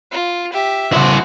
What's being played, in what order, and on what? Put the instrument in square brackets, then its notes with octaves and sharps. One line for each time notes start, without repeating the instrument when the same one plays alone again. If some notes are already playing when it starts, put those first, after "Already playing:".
[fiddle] F4
G4 E5
[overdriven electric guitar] E4 C5 [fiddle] F#4